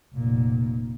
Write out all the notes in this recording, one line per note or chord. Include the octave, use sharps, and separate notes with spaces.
F1 A#2